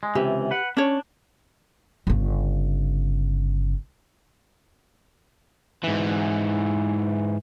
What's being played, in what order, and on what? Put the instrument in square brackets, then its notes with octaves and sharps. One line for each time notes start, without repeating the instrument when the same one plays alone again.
[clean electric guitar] G#3
[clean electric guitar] C#2 C3 E3 [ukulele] G4
[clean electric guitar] B4 F#5
[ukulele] C#4 C#5 [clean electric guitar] D4
[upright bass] G1 C#3
[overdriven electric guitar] G#2 E3